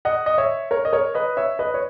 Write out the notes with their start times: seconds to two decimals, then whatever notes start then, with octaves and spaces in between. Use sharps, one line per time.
0.05 D#5 F#5
0.26 D#5
0.38 C#5 E5
0.71 A#4 C#5
0.85 D#5
0.93 A#4 C#5
1.15 B4 D#5
1.37 C#5 E5
1.59 B4 D#5
1.74 C#5